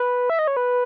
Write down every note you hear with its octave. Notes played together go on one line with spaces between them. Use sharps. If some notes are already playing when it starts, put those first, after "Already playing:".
Already playing: B4
E5
D#5
C#5
B4